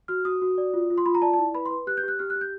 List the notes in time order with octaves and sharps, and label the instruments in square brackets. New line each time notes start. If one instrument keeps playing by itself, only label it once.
[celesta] F#4 F6
F#4 D#6
F#4
D5
F4
F4
C6
F4 B5
A#5
D5 A5
A5
E4
B4 B5
C6
B4
G4 F#6
G6
G4
F#6
G4 F6
F#6
G4
G6